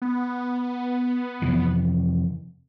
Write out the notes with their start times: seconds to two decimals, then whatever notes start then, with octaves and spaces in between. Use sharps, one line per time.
0.02 B3
1.42 F2 C3 E3